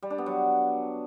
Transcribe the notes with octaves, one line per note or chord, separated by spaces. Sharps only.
G3
D4
B3
F#3